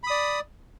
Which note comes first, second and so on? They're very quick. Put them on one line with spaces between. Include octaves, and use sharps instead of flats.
B5 D#6 D5